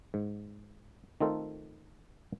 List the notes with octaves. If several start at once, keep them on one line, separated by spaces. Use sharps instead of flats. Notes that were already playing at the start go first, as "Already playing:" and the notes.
G#2
D#3 A3 C4 D#4 F4 A4